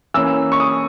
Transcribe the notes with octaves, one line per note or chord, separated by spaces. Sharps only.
E3 A#3 C#4 E6
C#6
D#6